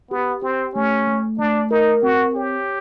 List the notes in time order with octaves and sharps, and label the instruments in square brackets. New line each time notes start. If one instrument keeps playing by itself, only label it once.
[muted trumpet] B3 [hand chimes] G4
[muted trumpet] C4 [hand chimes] G4
[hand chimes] A3 [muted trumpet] C#4
[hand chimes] A3
[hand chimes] A3 [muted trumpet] D4
[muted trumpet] D#4 [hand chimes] A#4
[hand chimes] C4 [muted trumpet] F#4
[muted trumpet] G4 [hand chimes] C#5